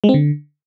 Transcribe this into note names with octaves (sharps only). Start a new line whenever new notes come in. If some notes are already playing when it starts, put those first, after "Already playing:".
G#3
C4
D3